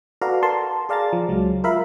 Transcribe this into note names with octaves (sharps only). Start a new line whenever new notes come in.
F#4 A4 B4 D5 F5 A#5
A#4 A5 C6
G#4 D5 F5 A5 A#5 A6
F3
C#2 F#3 G#3
F4 A#4 E5 F5 B5